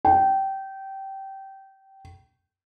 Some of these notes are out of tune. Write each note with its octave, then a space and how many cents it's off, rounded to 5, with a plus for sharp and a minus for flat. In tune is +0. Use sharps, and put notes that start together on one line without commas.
G5 -20